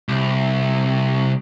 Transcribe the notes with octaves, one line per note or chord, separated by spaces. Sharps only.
C2